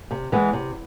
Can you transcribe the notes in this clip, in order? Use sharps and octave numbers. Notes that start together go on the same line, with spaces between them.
C3
E3 G#3 B3
C3